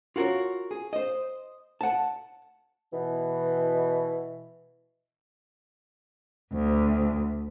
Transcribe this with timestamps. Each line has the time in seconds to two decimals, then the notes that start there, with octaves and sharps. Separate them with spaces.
0.16 F4 F#4 A4 A#4 C#5
0.71 G#4
0.93 C5 D#5
1.81 F#5 A5
2.92 B2 E3
6.53 D2